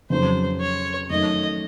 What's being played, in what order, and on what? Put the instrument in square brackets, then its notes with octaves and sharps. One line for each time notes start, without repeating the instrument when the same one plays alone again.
[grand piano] F2 C#3 F#3 [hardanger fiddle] C5
[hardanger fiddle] C#5
[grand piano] F#2 D#3 A3 [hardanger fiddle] D#5